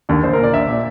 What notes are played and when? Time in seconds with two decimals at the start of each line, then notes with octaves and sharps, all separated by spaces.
0.09 D#2 D3
0.24 A#1 C5
0.33 A#2 A#4
0.43 D5
0.53 A#1 E5
0.68 A#2